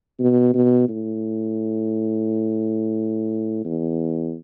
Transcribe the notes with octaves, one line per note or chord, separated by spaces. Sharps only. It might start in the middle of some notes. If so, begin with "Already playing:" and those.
B2
B2
A2
E2